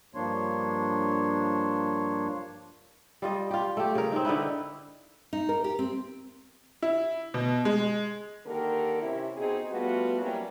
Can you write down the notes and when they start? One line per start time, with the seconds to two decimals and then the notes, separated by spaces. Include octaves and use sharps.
0.15 G2 F3 A#3 D4 C#5 C6
3.22 G3 F4 D#5
3.51 F4 G4
3.77 A3 G4
3.95 C#3 A#4
4.12 C4 D#4
4.25 D3 D#4 E4 B4
5.33 D#4
5.49 A#4
5.64 G4
5.79 C4
6.82 E4
7.34 B2
7.65 G#3
8.46 D3 D#3 A#3 G4 A#4
9.02 C3 C#4 E4
9.37 B2 C4 D#4 G#4
9.70 G3 A3 B3 F4 F#4 B4
10.20 F#3 G3 A#3 C4 C#4 E4